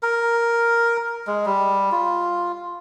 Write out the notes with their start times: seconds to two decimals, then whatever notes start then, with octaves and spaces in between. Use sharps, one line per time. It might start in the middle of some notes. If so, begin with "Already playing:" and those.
0.03 A#4
1.27 G#3
1.46 G3
1.92 F4